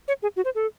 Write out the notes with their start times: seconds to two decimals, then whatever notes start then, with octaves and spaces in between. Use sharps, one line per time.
0.08 C#5
0.22 G#4
0.36 F#4
0.45 C5
0.55 A4